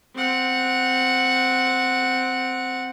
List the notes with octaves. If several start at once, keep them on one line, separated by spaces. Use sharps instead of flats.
C4 F#5